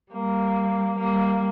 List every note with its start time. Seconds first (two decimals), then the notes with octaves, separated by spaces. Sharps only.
0.12 G3 A#3
0.99 G3 A#3